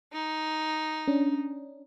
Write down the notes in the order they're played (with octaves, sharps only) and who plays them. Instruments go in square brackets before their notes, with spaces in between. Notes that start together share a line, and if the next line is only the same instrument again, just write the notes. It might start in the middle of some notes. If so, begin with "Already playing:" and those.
[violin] D#4
[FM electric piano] C#4 D4